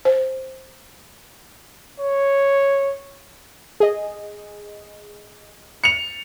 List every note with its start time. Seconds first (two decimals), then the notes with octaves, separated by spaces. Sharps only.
0.05 C5
2.00 C#5
3.80 G#4 D#5
5.84 C#7 F7